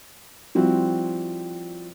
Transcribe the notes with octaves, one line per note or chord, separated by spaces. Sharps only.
F3 G3 C4 E4 F#4